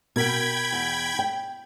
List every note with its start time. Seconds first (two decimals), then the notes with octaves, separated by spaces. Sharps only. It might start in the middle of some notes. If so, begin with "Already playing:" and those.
0.16 B2 A#4 G5 B5 G#6
0.72 E2
1.19 G5